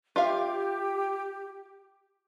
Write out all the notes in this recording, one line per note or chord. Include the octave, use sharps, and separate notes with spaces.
F4 G4 E5 F5